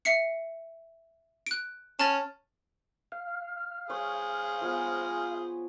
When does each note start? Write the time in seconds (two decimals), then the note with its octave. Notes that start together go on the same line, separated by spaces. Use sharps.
0.05 E5 C7 C#7
1.47 F#6 D7
2.00 C#4 A5 F6 A6
3.12 F5
3.90 G#4 C5 C#5
4.61 F3 B3 G#5